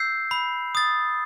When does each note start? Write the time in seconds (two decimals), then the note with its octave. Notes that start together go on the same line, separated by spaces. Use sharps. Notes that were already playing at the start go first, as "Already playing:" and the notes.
Already playing: E6 G6 C7
0.31 B5
0.75 D#6 A6